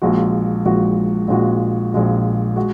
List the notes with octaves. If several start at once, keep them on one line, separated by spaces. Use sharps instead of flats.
A#1 A#2 G#3 F#4
A#1 A#2 G#3 F#4
A#1 A#2 G#3 F#4
A#1 A#2 G#3 F#4
G#3 F#4